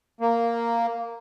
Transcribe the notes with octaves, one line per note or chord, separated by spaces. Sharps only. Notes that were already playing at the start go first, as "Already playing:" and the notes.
A#3